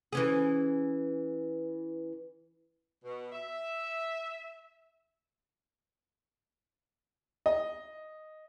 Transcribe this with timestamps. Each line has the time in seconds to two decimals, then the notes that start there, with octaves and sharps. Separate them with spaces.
0.13 E3 C#4 G#4
3.05 B2
3.32 E5
7.46 D#5